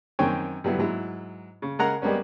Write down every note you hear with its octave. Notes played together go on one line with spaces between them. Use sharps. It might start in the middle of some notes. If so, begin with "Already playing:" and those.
F#2 D#3 C4 C#5 G5 G#5
G2 D3 F#3 B3 E4
G#2 F#3 E4
C#3
C#3 G#3 A#4 F#5 A#5
G3 G#3 A#3 B3 C#4